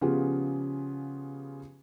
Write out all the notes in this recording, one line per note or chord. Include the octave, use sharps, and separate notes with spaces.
C#3 F3 B3 F4 G4 G#4